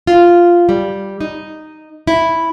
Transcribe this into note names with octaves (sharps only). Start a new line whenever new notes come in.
F4
G3
D#4
E4